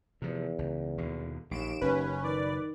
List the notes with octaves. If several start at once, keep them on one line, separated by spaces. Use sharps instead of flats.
E2 C3 F3
C#2
D#2 B2 D3
A#1 D#2 D7 E7
F#1 C#4 B4
D#3 D5